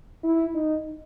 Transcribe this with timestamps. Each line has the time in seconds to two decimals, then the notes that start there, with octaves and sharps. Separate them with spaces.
0.24 E4
0.54 D#4